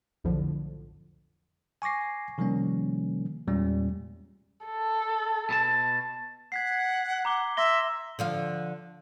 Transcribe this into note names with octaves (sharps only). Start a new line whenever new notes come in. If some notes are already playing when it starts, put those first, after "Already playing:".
B1 F2 A2 D3 F3
G#5 C#6 D6 A#6 C7
C3 D#3 F3 G3 A#3 C#4
E2 A#2 G3 G#3 C#4
A4
B2 A5 A6
F#5 G#6 B6 C7
A#5 D6 G7
E5 C6 A#6 G7
D3 F3 F5